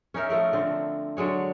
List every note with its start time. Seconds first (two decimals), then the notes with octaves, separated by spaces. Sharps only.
0.14 C#4 D#4 A#4 E5
0.29 F3 A3 A#4 D#5
0.53 D3 C4
1.17 D3 F#3 G#3 C#5